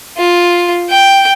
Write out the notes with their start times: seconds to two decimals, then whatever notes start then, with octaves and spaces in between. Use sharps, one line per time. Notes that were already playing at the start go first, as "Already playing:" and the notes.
0.17 F4
0.89 G5